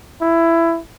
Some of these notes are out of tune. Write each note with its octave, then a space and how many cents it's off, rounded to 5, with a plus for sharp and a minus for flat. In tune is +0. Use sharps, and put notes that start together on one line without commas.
E4 +15